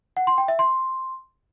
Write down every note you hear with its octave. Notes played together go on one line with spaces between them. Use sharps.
F#5
C6
G5
E5
C6